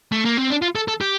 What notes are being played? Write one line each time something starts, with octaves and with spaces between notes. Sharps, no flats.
A3
A#3
C4
D4
F4
A4
A4
G4